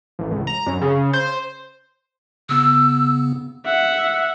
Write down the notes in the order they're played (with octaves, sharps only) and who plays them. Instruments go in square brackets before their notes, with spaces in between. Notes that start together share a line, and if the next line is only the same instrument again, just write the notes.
[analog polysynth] A1
C#2
A#5
F#2
C#3
C5
[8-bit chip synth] C#3 B3 [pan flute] E6
[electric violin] E5 F#5